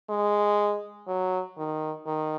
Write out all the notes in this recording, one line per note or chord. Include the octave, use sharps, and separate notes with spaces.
G#3
F#3
D#3
D#3